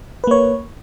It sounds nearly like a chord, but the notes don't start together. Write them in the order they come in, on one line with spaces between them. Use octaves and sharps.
B4 A#3 C#5